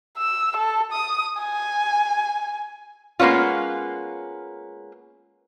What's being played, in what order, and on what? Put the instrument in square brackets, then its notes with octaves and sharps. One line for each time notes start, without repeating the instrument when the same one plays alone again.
[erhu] E6
A4
D#6
G#5
[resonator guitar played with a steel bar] G#3 A#3 B3 C#4 F4